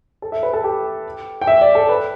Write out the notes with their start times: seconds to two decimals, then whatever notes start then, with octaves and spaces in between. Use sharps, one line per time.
0.22 A4
0.32 E5
0.43 B4
0.53 A4
0.64 G4
1.41 G5
1.47 E5
1.61 D5
1.75 A4
1.89 B4